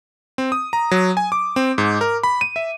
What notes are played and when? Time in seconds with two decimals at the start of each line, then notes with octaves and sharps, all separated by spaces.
0.38 C4
0.52 D#6
0.73 A#5
0.91 F#3
1.17 G#5
1.32 D6
1.56 C4
1.78 G#2
2.01 A#4
2.23 B5
2.41 D#7
2.56 E5